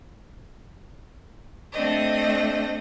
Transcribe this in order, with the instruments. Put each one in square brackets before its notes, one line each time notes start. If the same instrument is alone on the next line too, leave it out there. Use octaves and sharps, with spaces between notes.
[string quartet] A3 C4 D4 D#5